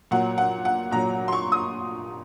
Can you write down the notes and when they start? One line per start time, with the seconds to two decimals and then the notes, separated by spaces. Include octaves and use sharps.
0.11 A#2 F#3 F#5
0.38 F#5
0.65 F#5
0.92 A#2 F#3 A#5
1.28 C6
1.33 C#6
1.52 D#6